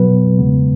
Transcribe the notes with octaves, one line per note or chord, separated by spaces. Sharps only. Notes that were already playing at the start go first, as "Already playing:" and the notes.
Already playing: B2 F#3 B3 B4
E2 C#3 G#3 B3